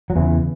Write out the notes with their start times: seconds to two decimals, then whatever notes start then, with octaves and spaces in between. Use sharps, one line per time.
0.10 F#3
0.15 E2 C#3 E3